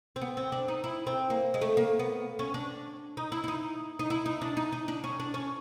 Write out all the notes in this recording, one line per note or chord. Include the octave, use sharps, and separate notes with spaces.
C4
B3
C4
D4
D#4
E4
C4
A#3
G#3
A3
A#3
B3
C#4
D4
D#4
E4
E4
D#4
D#4
E4
D#4
D4
D#4
D#4
D4
C#4
D4
C#4